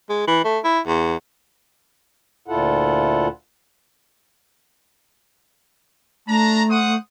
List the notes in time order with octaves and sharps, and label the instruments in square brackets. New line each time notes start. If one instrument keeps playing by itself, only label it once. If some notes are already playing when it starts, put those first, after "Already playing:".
[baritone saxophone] G#3
E3
A3
E4
E2
[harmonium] D2 A#2 E4 F4 A4 F#5
[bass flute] A3 [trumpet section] D4 A5 A#5
[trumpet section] C5 F#5 D#6